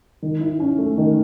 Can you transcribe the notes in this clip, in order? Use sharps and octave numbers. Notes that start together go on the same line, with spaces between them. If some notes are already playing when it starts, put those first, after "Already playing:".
D#3
E4
C#4
A3
D#3